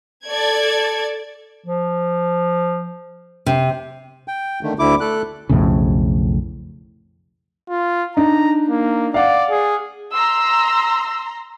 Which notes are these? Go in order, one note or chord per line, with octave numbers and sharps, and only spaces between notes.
A4 D5 G#6
F3
C3
G5
D3 D#3 A3
D2 D3 E4 D6
A3 A4 F#6
B1 F2 A2 C#3
F4
D4 D#4 A#5
A#3
D5 F5 F#5
G#4
A#5 C6 E6